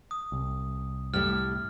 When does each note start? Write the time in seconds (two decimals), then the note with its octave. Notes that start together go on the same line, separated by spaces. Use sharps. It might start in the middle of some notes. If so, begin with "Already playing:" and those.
0.11 D#6
0.32 C2
1.14 A2 G3 F6